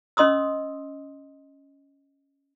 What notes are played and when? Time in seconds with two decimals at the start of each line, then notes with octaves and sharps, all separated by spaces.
0.17 C#4 D#5 C6 D#6 E6